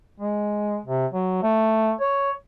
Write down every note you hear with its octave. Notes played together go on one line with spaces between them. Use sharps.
G#3
C3
F#3
A3
C#5